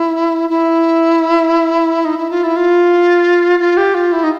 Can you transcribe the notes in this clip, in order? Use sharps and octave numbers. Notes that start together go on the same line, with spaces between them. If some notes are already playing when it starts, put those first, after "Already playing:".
Already playing: E4
E4
D#4
E4
F4
E4
F4
F4
G4
F4
E4
D#4